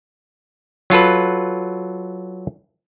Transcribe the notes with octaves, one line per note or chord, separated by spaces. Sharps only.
F#3 F4 A4 B4